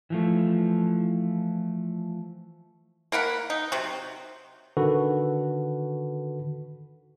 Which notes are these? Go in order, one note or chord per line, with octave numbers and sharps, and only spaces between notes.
E3 F3 A3
A#3 A#4 F#5 B5
D#4
C3 F#3
D3 D#3 F#4 A4 B4